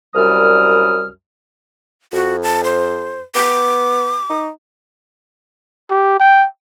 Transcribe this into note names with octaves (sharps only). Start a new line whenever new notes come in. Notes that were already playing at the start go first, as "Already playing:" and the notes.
C2 F#2 G3 D#6 F6
F2 F#4
A5
C5
B3 D6
D#4
G4
G5